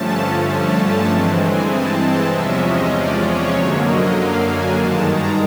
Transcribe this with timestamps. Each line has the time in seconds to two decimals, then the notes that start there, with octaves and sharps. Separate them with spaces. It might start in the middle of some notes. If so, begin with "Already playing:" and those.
Already playing: G2 D3 F3 A3 C#4 A5
0.47 A5
1.08 G2 E3 G#3 C4
1.40 G#5
1.70 A5
2.01 A5
2.32 E2 C3 F3 G#3 C#4 E5
2.62 D#5
2.93 D5
3.24 C#5
3.55 F#2 D3 F#3 A#3
3.86 D#5
4.16 F5
4.47 G#5
4.77 G2 D#3 G#3 A5
5.08 A#5